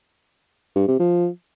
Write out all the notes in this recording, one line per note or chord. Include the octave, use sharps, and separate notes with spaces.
G2
C3
F3